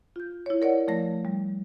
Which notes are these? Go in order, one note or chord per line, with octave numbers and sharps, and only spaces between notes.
F4 G6
E4 C#5
A#4 C#5 D5 F#5
F3 A3 A#6
G3